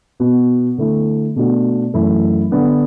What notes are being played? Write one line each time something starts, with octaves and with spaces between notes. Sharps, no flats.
B2 B3 F#4
D3 A3 E4
B2 A3 D4 F#4
F#2 E3 A3 E4
D3 B3 D4